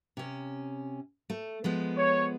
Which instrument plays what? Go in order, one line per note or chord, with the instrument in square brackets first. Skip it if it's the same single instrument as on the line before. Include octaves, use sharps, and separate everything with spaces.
[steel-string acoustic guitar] C3 C#4
A3
F3 G#3 B3
[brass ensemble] C#5